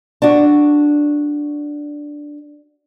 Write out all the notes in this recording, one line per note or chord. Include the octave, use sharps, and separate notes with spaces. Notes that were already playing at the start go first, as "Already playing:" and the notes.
D4 F#4